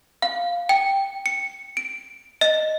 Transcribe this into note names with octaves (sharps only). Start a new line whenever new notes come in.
F5
G5
C#7
D7
D#5